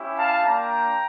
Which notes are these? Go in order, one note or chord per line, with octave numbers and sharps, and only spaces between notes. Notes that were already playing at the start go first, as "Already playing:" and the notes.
Already playing: C#4 E4 G4
F5 A5
A#3 D4 F4 G5 A#5